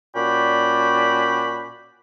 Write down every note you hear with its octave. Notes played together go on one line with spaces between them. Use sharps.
A#2 C#4 F#4 D5 G5 B5